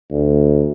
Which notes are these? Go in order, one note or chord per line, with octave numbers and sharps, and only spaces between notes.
D2